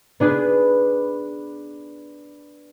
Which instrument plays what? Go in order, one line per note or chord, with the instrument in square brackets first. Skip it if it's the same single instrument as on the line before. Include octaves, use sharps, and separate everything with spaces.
[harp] B3 D4 G#4 B4